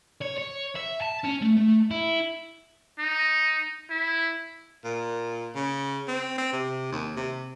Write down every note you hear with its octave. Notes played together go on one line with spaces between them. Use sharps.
C#5
C#5
E5
A5
C#4
A3
A3
E4
D#4
E4
A#2
C#3
C4
C4
C3
D#2
C3